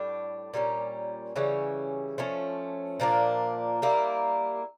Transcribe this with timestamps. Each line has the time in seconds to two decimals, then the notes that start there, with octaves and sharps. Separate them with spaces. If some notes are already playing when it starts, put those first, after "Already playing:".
Already playing: A2 G3 D4
0.54 A#2 G3 A#3 C#4
1.36 C#3 E3 G3 C#4
2.18 F3 A3 C#4
3.00 A#2 F3 A#3 D4
3.82 G3 A#3 E4